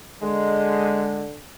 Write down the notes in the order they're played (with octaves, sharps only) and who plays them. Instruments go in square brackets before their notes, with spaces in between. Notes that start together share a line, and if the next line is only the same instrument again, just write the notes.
[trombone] D3 [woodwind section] G#3